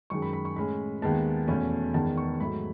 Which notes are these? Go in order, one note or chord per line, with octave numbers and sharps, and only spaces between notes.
F#2 D#3 G#3 C#6
B5
B5
C#6
A2 G#3 C#4 B5
D#2 D#3 G#3 B3 A5
E2 B2 A3 C#4
E2 D#3 G#3 B3 A5
C#6
G#2 F#3 A3 B5